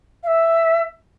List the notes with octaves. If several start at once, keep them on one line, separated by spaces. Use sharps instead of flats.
F5
E5